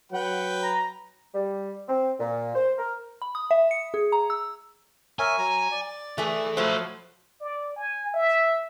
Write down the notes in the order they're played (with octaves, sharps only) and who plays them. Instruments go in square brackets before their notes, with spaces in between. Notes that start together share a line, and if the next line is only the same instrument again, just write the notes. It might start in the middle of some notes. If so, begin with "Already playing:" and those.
[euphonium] F#3 [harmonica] B4 G5 [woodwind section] F#5
[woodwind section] A#5
G3
C4
A#2
C5
A#4
[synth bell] B5
D#6
E5
C#7
G#4
A#5
E6
[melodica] A#4 C#5 E5 [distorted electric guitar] G#5
[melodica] F#3 A#5
D5
[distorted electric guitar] E3 [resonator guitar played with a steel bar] A3 G#4
[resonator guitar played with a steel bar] F3 F#3 [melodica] A3 E5 [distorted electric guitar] C5 B5
[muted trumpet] D5
G#5
E5